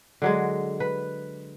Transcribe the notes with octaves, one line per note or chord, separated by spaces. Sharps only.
D3 F#3 G#3
B4